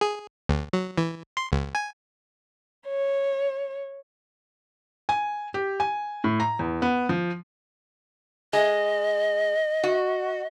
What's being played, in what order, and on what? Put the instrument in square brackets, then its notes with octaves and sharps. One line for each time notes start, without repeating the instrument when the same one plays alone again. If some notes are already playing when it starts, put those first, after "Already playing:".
[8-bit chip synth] G#4
D2
F#3
E3
C6
C#2
G#5
[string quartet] C#5
[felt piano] G#5
G4
G#5
A2
A#5
E2
B3
F3
[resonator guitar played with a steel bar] G#3 [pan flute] D#5
[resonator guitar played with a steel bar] F#4